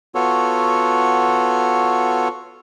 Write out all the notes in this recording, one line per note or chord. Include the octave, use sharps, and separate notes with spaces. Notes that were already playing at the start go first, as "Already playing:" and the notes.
B3 F4 F#4 A4 C#5